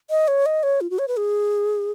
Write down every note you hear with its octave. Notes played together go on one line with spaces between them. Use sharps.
D#5
C#5
D#5
C#5
F4
F#4
C#5
B4
G#4